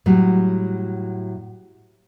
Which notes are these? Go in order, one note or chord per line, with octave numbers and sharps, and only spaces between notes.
A2 F#3 G3